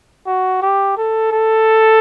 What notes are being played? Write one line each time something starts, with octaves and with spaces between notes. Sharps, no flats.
F#4
G4
A4
A4